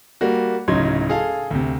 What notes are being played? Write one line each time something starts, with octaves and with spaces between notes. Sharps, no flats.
G3 A#3 F#4
D1 C#3 F#3 D#4 C6 G#6
G#4 A4 F5
D2 C3